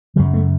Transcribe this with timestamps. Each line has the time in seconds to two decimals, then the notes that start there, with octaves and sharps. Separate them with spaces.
0.16 F#2 C#3 F#3
0.34 A3